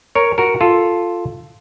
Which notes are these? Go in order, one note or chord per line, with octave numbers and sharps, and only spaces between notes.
A#4 C#5
F#4 A#4
F4 A4